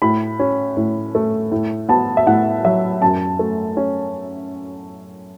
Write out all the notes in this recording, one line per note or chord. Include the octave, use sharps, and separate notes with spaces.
A2 B5
C#4
A2
A3
A2
B3 A5
E5
A2 F#5
F#3 E5
F#2 A5
A3
C#4